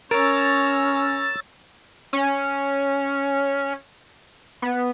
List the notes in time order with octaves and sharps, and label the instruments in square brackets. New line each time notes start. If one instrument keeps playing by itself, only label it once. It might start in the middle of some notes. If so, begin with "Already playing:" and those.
[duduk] C#4 [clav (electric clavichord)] A#4 [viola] C#5 A#5 [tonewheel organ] E6 A6
[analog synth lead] C#4
B3